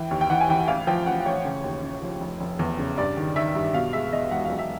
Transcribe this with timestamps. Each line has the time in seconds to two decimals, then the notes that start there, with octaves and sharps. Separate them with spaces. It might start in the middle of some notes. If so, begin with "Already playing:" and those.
Already playing: E3 G5
0.11 D#2
0.21 G5
0.30 E3 F#5
0.41 G#5
0.49 E3 G5
0.59 F#5
0.68 A1 F5
0.87 F3 G5
1.06 A1 F#5
1.25 A1 C#5
1.45 C#3
1.64 D#2
1.83 C#3
2.02 F3
2.21 F1
2.40 F1
2.59 E2
2.79 C#3
2.98 G2 D5
3.17 D#3
3.36 D#3 E5
3.55 G2
3.74 B2 F5
3.93 G#3 E5
4.12 E2 D#5
4.31 E1 F#5
4.45 B1 F5
4.59 E5